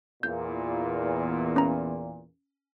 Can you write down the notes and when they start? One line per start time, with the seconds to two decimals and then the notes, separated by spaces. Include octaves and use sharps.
0.23 E2 A#2 G6
1.56 C#4 A#5